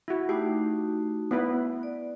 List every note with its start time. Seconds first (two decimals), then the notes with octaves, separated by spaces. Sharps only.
0.08 E4 F#4
0.29 A3 D#4 F#4 G4
1.31 B3 E4 B4
1.83 D5